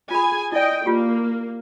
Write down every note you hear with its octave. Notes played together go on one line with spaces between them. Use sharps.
F4 G#4 G#5 B5
E4 D5 D#5 G5
A#3 F4 G4